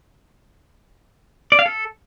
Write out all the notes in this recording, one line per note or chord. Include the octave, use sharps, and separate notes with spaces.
D5
F5
A4